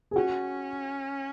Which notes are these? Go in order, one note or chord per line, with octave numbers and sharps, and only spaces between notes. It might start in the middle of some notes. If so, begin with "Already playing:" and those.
G#4
C#4 F#4